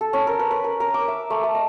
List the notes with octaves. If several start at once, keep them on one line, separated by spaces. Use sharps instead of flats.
A4
C#4
A#4
B4
B4
A#4
A#4
D6
E5
A3
A3
D#5